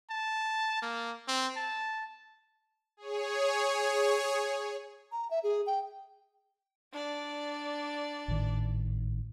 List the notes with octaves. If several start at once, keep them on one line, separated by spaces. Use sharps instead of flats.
A5
A#3
C4
A5
G#4 C#5
A#5
E5
G#4
G5
D4 D5
G#1 A2 D#3